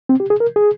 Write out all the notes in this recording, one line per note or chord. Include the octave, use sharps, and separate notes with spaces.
C4
G4
G#4
A#4
G#4